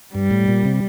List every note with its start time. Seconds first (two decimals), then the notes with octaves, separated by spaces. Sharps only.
0.15 G2 G3
0.31 A2
0.48 A#2
0.65 C3